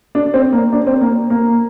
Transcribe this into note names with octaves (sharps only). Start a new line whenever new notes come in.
D4
C4
A#3
D4
C4
A#3
A#3